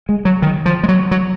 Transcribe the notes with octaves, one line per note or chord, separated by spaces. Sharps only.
G#3
F#3
D#3
F3
G#3
F#3
F#3